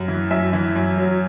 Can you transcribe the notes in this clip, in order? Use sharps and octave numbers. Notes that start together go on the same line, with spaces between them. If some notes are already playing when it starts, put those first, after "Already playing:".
Already playing: F#2
E3
F#2 E5
E3
F#2
F#3